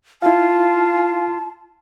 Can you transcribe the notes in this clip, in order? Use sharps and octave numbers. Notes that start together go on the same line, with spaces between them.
E4 F4 F5 A5